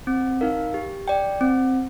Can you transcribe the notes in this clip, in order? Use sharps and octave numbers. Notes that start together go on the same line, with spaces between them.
C4
D#4 A#4 F5
G4
D5 G5
C4